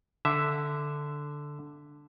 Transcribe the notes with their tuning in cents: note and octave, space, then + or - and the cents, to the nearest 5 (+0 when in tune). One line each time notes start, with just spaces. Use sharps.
D3 +0 E5 +0